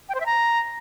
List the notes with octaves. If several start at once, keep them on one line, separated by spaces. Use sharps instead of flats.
G5
C5
E5
A#5